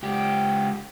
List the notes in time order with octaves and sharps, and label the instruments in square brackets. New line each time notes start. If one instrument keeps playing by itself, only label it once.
[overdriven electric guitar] C#2 G4